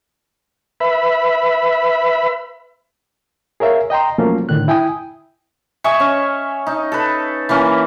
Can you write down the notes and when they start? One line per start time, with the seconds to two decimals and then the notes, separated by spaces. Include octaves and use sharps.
0.80 B4 E5 B5
3.60 G#4 A#4 C#5 E5 F5
3.90 D#5 G5 A#5 C6
4.18 F3 F#3 A3 A#3 C#4 F4
4.49 A2 D3 D#3 F#6
4.68 E4 G5 G#5 D#6
5.84 D#5 E5 G#5 C#6
6.00 C#4
6.67 D#4
6.92 A4 B4
7.49 E3 A#3 C#4